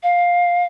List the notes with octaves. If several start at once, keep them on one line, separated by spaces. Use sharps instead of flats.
F5